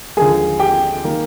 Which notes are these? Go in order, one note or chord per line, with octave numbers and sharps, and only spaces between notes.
D#2 D3 F3 G#3 G#4 G#5
G4 G5
D#3 A#3